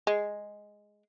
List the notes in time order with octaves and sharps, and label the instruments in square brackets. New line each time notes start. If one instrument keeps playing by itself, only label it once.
[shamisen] G#3